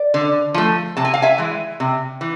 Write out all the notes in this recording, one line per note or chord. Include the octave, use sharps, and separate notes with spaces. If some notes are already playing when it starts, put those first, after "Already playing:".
Already playing: D5
D3
F3 A3
C3 A5
G#5
F5
E5 G#5
E3 G#3
C3
E3